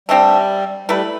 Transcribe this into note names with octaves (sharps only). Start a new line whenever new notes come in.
D3 G3 A3 C4 G4
G3 A3 E4 B4